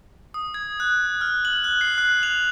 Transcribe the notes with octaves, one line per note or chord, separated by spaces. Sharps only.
D#6
G#6
F#6
F6
F#7
F#6
C7
F#6
F7